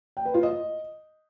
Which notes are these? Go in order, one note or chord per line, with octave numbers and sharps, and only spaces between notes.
G5
B4
F4
D#5